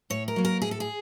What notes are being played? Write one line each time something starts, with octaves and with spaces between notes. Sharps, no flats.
A2 C#5
A#4
F#3 A#3
A#4
A2 G#4
A4
G#4